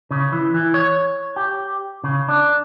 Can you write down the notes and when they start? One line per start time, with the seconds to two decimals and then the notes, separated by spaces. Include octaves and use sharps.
0.11 C#3
0.32 E3
0.54 E3
0.74 C#5
1.36 G4
2.04 C#3
2.28 D4